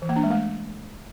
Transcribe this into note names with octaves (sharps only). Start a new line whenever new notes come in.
E3
A#3
D4
G#3
A3